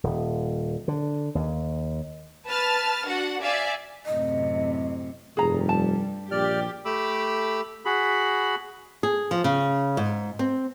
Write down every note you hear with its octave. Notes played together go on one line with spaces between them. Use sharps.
D#1
D3
D#2
B4 A5 F6 A6
D4 F#4 F#5
D5 E5 F5 G#5
F#2 A2 C3 D#5
F1 G2 G3 G#4 A#5
A5
A#1 G4 D5 F6
A3 G4 B5 D6 E6
F#4 G#4 B5
G#4
F3
C#3
G#2
C4